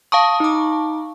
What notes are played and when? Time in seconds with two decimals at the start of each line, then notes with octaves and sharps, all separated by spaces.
0.12 F5 A5 C#6 D#6
0.40 D#4 D6